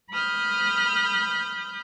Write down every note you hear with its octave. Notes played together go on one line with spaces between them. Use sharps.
B5 D#6 F6 G6